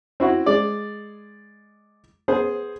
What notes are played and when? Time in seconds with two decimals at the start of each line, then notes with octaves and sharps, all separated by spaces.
0.20 C4 E4 F#4
0.46 G#3 D5
2.28 B3 G#4 C5